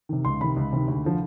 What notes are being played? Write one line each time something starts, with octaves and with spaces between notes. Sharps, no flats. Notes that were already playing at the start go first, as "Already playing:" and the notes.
C3 D#3
C#2 C6
C3 D#3 B5
C#2
C3 D#3
D2
D3 F3